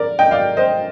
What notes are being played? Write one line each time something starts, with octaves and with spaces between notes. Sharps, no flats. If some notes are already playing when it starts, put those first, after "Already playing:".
Already playing: A#4 D5
D#5 G5
D5 F5
C5 D#5